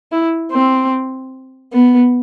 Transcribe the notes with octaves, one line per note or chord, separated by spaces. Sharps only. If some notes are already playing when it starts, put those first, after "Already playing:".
E4
C4
B3